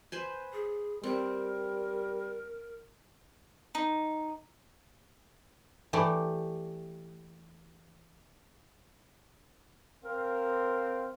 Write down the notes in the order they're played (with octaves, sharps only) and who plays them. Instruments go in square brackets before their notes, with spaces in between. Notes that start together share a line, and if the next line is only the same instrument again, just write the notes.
[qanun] B4 C5 G#5
[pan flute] G#4
[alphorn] G3 [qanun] C4 [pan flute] A#4
[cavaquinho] D#4
[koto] E3 A3 G4 D5
[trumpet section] C4 F5 [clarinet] A#4